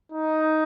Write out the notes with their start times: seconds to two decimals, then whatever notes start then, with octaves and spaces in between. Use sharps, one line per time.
0.12 D#4